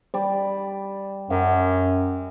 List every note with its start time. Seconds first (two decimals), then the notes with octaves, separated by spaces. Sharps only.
0.14 G3 D5
1.30 F#2 F#5